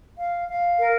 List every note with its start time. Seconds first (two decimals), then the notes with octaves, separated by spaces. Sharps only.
0.18 F5
0.48 F5
0.78 A#4